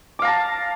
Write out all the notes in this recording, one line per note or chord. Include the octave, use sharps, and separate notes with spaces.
F5 A5 A#5 D6